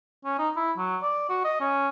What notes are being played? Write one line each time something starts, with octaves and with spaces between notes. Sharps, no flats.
C#4
D#4
E4
F#3
D5
F#4
D#5
C#4